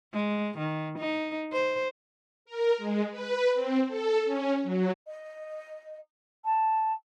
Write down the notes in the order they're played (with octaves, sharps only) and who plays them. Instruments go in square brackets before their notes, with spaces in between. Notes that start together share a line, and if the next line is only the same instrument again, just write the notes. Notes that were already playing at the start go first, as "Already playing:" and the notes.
[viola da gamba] G#3
D#3
D#4
C5
[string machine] A#4
G#3
B4
C4
A4
C#4
F#3
[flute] D#5
A5